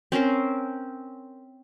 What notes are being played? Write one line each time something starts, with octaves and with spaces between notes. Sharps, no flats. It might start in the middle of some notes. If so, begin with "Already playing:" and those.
C4 C#4 A#4 C5